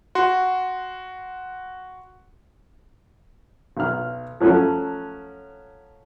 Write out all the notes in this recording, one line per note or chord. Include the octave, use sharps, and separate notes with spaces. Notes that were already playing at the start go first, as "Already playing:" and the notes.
F#4 C6
B1 F6
F3 F#3 A3 C#4